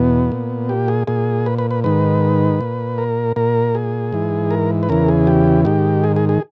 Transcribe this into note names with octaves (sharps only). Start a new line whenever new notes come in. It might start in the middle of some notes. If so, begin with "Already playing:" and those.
Already playing: E2 B2 B3
A#2
G4
G#4
A#2 G#4
B4
B4
B4
G#2 D#3 B4
A#2
A#4
A#2 A#4
G#4
G#2 E3
A#4
B4
E2 C#3 E3 A#4
G#4
G4
G#2 D#3 G4
G#4
G#4
G#4